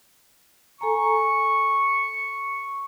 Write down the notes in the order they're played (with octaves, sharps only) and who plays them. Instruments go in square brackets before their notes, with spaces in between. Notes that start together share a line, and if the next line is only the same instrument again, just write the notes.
[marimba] A4 G#5 A#5 [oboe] C#6